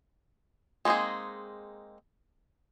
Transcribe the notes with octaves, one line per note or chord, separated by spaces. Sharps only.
G#3 A#3 C4 D#4 G#4